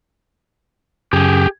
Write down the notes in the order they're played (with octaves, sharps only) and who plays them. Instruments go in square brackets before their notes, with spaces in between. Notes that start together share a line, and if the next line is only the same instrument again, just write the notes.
[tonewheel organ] F#2 C#3 [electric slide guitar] G4 G#4